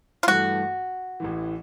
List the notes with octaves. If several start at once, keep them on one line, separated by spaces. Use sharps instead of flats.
F4
G2 E3 A3 F#4
A1 A2 E3